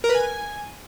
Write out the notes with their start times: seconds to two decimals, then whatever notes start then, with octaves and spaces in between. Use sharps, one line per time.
0.04 A#4
0.09 B4
0.15 G#5